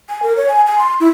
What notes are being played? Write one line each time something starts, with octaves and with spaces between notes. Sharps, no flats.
G#5
A#4
C#5
G#5
G#5
C6
E4